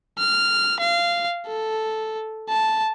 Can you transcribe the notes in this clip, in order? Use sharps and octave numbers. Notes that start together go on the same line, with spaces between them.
F6
F5
A4
A5